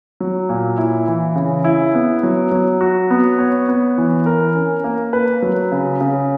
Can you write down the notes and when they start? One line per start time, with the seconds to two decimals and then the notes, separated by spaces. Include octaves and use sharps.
0.20 F#3
0.49 A#2
0.78 E4
1.07 E3
1.35 C#3
1.64 E4
1.95 B3
2.23 F#3
2.52 F#3
2.81 F#4
3.11 B3
3.39 C#5
3.68 B3
3.98 E3
4.26 A#4
4.55 C#4
4.84 A#3
5.13 B4
5.42 F#3
5.72 C#3
6.01 C#3